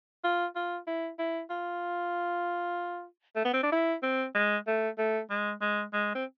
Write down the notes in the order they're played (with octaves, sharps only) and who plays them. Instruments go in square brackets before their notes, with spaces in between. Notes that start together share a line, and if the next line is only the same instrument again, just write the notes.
[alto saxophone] F4
F4
E4
E4
F4
A3
B3
C4
D4
E4
C4
G#3
A3
A3
G#3
G#3
G#3
C4